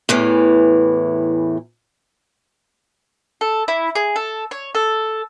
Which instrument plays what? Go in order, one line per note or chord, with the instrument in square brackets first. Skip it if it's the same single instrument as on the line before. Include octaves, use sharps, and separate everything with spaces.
[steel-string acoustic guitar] E2 A2 E3
[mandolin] A4
E4
G#4
A4
C#5
A4